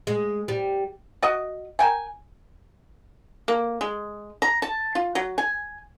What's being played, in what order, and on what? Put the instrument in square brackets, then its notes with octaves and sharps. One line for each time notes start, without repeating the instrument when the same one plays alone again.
[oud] G#3
G3
[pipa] F#4 D#5
A#4 G5 G#5
A#3
G#3
A#5
A5
F4
F#3
G#5